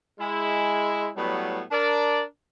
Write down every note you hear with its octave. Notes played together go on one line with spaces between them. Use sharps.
G#3 E4
A2 F#3 G3 B3
D4 A#4 D5